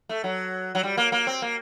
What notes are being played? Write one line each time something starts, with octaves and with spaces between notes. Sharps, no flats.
A3
F#3
F#3
G3
A#3
A#3
C4
A#3